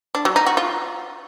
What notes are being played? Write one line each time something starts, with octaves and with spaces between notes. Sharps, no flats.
D4
F#3
D#4
F#4
F4